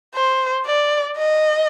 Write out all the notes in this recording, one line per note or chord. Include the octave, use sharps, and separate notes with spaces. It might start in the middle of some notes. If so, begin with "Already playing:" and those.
C5
D5
D#5